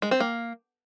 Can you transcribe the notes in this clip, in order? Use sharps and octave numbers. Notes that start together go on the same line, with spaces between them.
G#3
C4
A#3